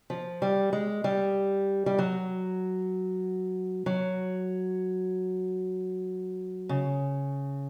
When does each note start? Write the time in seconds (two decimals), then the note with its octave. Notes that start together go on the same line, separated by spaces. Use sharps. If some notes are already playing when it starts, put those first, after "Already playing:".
0.10 F3
0.42 G3
0.73 G#3
1.04 G3
1.86 G3
1.99 F#3
3.86 F#3
6.69 C#3